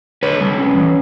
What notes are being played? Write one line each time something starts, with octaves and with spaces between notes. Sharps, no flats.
D3 B4 C#5
G3
C#4
E3